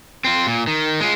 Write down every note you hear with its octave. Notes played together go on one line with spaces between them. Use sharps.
C4 F4
A#2
D#3
G#3 F4